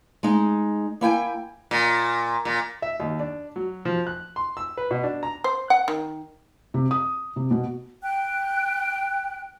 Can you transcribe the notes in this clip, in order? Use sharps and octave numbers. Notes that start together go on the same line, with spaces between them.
G#3 D#4
A#3 E4 G5 G#5
A#2
A#2
E5
D#2
D4
F#3
F3
F#6
C6
E6
B4
B2
D4
A#5
C5
F#5
D#3
C3
D#6
C3
B2
G5 F#6